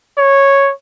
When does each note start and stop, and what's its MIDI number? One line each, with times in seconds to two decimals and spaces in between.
0.18 0.71 73